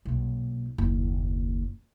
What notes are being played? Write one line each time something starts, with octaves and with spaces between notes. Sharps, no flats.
B1 A#2
F#1 D#2